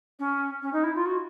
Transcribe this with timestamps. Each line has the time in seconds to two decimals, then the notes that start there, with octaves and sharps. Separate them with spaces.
0.19 C#4
0.62 C#4
0.73 D#4
0.84 E4
0.95 F4
1.06 F#4